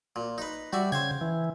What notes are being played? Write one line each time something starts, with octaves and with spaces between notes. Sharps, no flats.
A#2
D#4 B4
G3 F#4 D5 E5
C#3 C5 F5 G5 G#6
E3